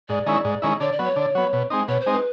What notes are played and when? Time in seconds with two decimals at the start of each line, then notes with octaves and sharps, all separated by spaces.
0.09 G#2 D5
0.26 D#3 G#3 C#4 E4
0.45 G#2
0.62 D#3 G#3 C#4 E4
0.80 D3 C#5
0.92 D5
0.99 F#3 B3
1.05 C#5
1.16 D3
1.35 F#3 B3
1.53 B2
1.70 G#3 C4 D#4
1.88 B2 C#5
2.01 C5
2.06 G#3 C4 D#4
2.13 B4